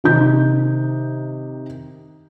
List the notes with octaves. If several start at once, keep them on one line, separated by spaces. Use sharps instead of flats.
C3 D#3 D#4 G6